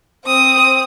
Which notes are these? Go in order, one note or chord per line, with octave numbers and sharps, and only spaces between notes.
C4 D#6